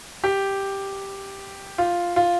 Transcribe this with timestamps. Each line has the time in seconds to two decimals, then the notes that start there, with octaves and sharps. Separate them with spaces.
0.24 G4
1.78 F4
2.16 F4